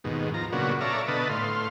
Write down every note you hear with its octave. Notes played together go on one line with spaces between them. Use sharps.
D#2 G#2 B2
F3 A#5
A#2 C#3 F#3 B3 D4 F#4
A4 C#5 D5 E5 F5 A#5
B2 D3 B4 D#5 A5
A2 F5 C6